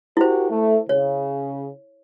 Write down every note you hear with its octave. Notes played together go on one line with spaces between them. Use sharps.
E4 F#4 G4 A#4 C5
A3
C#3 C#5